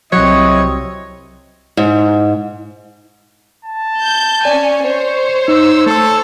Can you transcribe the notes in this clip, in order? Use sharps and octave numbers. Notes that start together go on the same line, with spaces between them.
C2 C3 F#3 E4 C#5 D#5
G#2
A5
G6
C#4 D5 G#5
C5 C#5
D#4 E6
A3 A4 E6